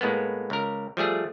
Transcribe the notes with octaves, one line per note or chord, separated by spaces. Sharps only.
A2 G#3 A#3 B3
C#2 A#4
F3 G3 A3 G#4